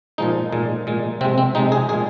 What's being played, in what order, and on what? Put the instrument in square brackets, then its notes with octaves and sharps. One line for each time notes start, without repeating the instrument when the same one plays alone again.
[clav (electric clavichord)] A#2 F3 G#3 D#4
A#2 G#3
A#2 G#3
C3 C4
G#3
C4
C3 G#3 D#4
G#4
A#2 G#3 G#4